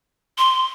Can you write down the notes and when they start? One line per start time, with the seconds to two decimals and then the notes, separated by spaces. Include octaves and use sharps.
0.38 C6